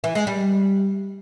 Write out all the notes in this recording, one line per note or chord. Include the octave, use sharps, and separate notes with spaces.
E3
G#3
G3